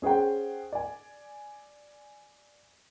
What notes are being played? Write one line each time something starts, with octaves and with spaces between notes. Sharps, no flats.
C#4 G#4 C5 F#5 G5
D5 G#5